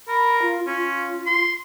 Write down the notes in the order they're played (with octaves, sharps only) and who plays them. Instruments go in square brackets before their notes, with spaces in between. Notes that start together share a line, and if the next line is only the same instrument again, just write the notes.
[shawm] A#4 [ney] B5
[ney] F4
[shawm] C#4 [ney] F4
[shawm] C6